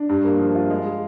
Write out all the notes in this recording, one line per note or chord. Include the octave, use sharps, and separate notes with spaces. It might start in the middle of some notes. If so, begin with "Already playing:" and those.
Already playing: D4
G2
A#3
F3
F4
G#3
G#4